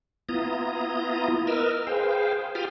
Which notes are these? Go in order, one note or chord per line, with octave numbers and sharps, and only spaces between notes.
B3 E4 F4 A#5 D#6
A#4 B4 D#5 E6 F6
G#4 B4 C5 F5 G5
F4 G4 G5 D#6 F6